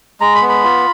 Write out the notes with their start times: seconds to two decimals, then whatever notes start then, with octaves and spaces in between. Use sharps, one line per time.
0.21 G#3 A#5
0.35 B5
0.41 B3
0.49 B5
0.64 F4